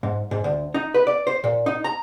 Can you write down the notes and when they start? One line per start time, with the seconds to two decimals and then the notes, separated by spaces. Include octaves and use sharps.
0.03 G#2
0.31 G#2
0.44 D2
0.74 D#4
0.94 B4
1.07 D5
1.27 C5
1.44 A#2
1.66 D#4
1.84 A#5